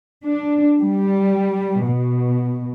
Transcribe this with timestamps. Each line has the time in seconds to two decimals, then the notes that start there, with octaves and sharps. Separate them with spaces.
0.23 D4
0.80 G3
1.83 B2